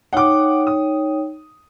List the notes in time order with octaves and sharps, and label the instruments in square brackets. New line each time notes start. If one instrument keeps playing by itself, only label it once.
[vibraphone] D#4 C#5 G5 [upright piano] F#5 D6
[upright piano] D#6